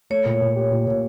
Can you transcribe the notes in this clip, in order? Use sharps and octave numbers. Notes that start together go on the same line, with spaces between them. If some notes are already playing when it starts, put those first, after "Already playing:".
A3 C#5
A#2
A#2
G4
A#2
A#2